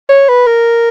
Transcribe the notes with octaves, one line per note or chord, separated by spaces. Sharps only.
C#5
B4
A#4